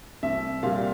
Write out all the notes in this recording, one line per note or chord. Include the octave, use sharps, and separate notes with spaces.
C2 E5
A#2 G3 F5